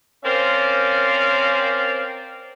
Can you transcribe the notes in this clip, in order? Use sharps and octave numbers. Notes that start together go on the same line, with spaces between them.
C4 C#4 A#4 C5 D5 F5